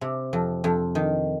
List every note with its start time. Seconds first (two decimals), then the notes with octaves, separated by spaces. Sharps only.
0.01 C3
0.33 F2
0.64 F2
0.95 D#3